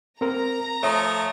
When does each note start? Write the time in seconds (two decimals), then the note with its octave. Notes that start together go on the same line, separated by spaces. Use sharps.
0.21 C4 A#4 A#5
0.83 F3 A3 C#5 E5 D#6